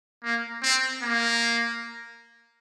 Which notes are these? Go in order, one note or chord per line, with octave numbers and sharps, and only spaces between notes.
A#3
C4
A#3